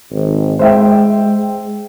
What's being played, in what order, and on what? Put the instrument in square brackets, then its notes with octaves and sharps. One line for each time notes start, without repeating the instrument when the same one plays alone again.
[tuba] G#1
[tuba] G#3 [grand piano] C5 E5 G5